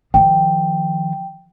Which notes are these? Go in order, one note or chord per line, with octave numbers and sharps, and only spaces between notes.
D#3 F3 G5